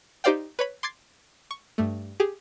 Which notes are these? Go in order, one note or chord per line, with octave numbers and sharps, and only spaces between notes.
D#4 G4 C5 D5 F5 G5
B4 C#5 B5
C6 D6 G#6 A6 C7
C#6
G2 A3
G4 G#4